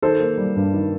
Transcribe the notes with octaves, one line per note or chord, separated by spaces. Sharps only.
D#3 A4 C5
A#3
G3
G2
D#3